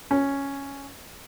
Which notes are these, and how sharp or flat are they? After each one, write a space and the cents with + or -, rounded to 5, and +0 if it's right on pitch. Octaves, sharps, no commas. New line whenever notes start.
C#4 +0